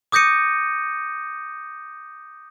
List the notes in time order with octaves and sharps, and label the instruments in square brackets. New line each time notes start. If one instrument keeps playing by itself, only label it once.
[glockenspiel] D6 D#6 G6 A#6 C#7 D#7